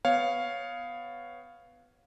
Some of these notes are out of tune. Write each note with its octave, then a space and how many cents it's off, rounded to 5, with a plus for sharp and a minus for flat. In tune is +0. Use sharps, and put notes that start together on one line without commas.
B3 +15 C#5 +0 F5 +0